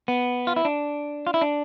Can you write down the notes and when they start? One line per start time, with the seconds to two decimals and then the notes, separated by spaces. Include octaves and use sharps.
0.08 B3
0.47 F4
0.56 E4
0.65 D4
1.27 F4
1.34 E4
1.42 D4